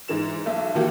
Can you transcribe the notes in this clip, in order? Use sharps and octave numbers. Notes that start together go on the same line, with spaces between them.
G#2 E3 E7
B1 E5
D#2 E3 A#3 F#4 G4